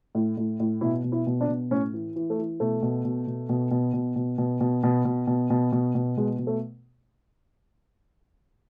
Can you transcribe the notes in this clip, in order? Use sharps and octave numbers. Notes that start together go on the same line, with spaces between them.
A2
A2
A2
B2 E4
B2
E4
B2
D4
B2
A2 C#4
E3
E3
A3
E3
B2 A3
B2
B2
B2
B2
B2
B2
B2
B2
B2
B2
B2
B2
B2
B2
B2
B2 G#3
B2
A3